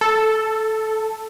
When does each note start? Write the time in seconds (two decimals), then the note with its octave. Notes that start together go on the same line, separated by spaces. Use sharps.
0.01 A4